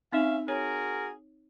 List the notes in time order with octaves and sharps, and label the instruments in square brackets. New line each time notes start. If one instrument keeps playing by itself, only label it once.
[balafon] C4 D#4 [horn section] C#4 E5 F5
[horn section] F#4 G#4 A#4 [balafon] C#5